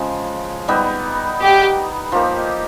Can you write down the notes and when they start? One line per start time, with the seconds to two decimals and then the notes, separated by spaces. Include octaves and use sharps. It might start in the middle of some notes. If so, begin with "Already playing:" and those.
Already playing: C#3 F3 G#3
0.68 G3 B3 D#4
1.41 G4
2.12 F3 A#3 D#4 G4